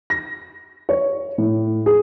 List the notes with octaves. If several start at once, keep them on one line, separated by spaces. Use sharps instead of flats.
A#6
C#5
A2
G#4